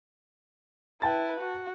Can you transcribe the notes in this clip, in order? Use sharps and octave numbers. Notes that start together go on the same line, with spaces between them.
E4 B4 G5 A5 A6
F#4